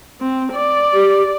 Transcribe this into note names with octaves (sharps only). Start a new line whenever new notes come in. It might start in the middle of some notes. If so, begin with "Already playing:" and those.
C4
D5
G4